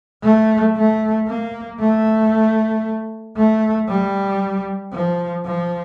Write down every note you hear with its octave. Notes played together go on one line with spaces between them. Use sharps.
A3
A3
A#3
A3
A3
G3
F3
F3